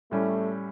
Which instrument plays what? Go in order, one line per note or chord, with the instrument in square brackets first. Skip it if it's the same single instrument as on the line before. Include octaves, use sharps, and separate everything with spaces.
[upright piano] A2 G3 C#4 [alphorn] A3